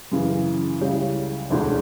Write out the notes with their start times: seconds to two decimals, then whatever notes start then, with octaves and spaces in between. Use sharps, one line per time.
0.11 F#2 C#3 E3
0.81 C#2 C#3 G3 C#4 E4
1.50 E1 D2 D3